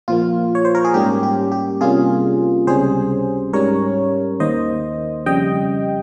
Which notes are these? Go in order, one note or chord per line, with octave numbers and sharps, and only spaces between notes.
A#2 F3 A#3 F4
C#5
C5
A#4
G#4
G#2 G3 A#3 C#4 G4
G4
G4
C3 G3 A#3 C#4 F4 G#4
C#2 C3 G3 C#4 G#4 C5
G#2 G3 C#4 A#4 C#5
D#2 D#3 A#3 C5 D#5
F2 C#3 G3 D#5 G5